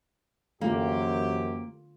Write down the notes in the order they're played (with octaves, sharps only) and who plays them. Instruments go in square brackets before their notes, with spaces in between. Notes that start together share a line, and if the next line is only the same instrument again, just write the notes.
[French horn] F#2 [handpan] D3 F4 [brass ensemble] E3 C4 G4 [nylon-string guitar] A#3